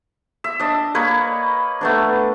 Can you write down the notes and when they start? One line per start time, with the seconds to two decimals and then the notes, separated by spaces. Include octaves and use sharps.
0.44 E5
0.59 D4 D#5
0.95 A#3 B4 C#5
1.81 A3 B3 D4